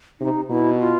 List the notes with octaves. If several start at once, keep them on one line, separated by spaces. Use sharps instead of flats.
C3 D#4
B2 E4
F4